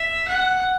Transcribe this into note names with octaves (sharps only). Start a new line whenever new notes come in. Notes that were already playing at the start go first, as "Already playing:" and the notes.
Already playing: E5
F#5